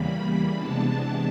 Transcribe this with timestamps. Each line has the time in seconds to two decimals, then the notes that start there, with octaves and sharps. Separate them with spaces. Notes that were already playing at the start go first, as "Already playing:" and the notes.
Already playing: E2 C#3 E3 G3 A#3 B5
0.55 C3 E3 G#3 B3 D4 A5